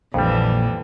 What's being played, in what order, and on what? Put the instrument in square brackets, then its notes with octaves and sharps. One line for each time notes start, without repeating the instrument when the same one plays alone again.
[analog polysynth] A#1 [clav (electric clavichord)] F2 G3 [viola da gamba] D3 E3